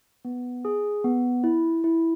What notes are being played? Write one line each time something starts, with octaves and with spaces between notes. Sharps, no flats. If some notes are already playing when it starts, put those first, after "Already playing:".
B3
G#4
B3
E4
E4